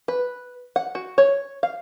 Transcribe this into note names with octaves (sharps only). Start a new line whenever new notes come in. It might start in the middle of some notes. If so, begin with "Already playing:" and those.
B4
F#5
F#4
C#5
F5